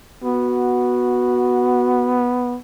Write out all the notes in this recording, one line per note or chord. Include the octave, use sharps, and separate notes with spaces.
B3 F#4